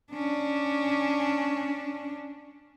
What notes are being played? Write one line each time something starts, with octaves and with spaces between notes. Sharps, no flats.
C#4 D4